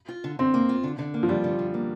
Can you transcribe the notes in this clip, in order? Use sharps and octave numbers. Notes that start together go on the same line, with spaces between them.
F4
D3
D3 C4
A#3
F4
D3
D3
A#3
F3
G3 F4
D3
D3
A#3